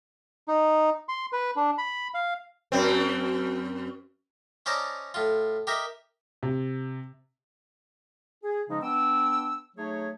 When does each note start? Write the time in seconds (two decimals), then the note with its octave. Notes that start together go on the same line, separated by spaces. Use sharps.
0.48 D#4
1.09 C6
1.33 B4
1.56 D4
1.78 B5
2.14 F5
2.72 F#2 C4
4.66 C#4 C5 D5 D#5 A5 A#5
5.14 A2 F4
5.67 G4 A#4 D#5 E5
6.43 C3
8.43 G#4
8.69 C#3 F3 G#3 C#4 D#4
8.81 B3 D4 G5 E6
9.76 F#3 A3 D#4 G#4 C#5